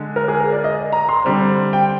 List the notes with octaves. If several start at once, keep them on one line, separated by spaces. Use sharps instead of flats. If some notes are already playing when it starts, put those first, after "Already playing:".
Already playing: D3 G#3
A#4
G#4
A#4
D5
D#5
A#5
C6
D3 G3 C4
G5